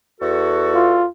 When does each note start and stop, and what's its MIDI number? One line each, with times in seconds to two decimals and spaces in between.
0.20 1.02 40
0.20 1.02 66
0.20 1.02 69
0.74 1.08 65